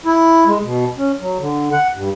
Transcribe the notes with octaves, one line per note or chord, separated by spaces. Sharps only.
E4
G#3
B2
C#4
F#3
D3
F#5
G2